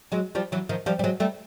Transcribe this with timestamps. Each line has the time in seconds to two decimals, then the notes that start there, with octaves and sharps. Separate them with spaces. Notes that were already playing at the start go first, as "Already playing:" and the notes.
0.12 F#3 G#3
0.35 F3 G3
0.52 E3 F#3
0.69 D#3 F3
0.86 F3 G3
0.99 G3
1.04 F#3 G#3
1.20 G3 A3